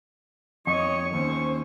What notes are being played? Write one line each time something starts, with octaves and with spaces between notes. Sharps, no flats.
F2 C#5 D#5 C#6
D#2 C#4 C5